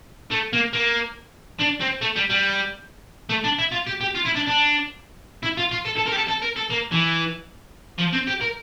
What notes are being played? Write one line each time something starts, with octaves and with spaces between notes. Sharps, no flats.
A3
A#3
A#3
D4
C4
A3
G3
G3
A3
D4
E4
F4
G4
G4
F4
E4
D4
D4
E4
F4
F4
A4
A4
A#4
G4
A4
A4
A#4
A4
A#3
E3
F3
C4
G4
A#4